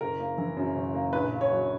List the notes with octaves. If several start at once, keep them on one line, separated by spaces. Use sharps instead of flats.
F#1 A#4
A#3
E3
F#2
F#1
A#3
A#1 B4
A#3
C#5
F#3